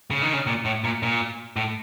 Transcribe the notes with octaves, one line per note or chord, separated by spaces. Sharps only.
C#3
D#3
C#3
A#2
A2
A#2
A#2
A2